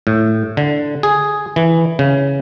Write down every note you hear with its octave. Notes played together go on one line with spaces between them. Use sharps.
A2
D3
G#4
E3
C#3